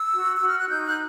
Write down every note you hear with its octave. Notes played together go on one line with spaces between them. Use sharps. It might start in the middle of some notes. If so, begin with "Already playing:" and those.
Already playing: E6
F#4
F#4 E6
F6
F#6
D#4 G6
F#6